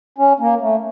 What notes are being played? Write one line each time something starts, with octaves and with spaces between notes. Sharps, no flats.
C#4
A#3
A3